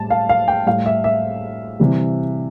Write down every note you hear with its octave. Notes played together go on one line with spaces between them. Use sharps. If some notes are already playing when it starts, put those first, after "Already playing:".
Already playing: A2 G3 A5
F5
F5
G5
A2 G3 F5
E5
E5
C3 E3 G3